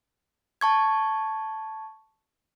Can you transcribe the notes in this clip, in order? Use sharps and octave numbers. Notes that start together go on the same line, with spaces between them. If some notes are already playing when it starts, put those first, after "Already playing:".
A5 C#6 G#6